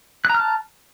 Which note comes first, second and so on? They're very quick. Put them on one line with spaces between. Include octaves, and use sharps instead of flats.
F#6 A#5 F6 A5